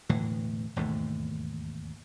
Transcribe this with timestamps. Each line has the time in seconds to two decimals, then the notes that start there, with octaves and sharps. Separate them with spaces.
0.09 E1 A2 D3 E3
0.76 E1 D#2 G#2 A3